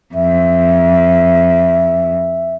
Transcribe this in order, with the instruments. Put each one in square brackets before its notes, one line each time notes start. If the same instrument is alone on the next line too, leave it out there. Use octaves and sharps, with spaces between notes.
[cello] F2 [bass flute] E5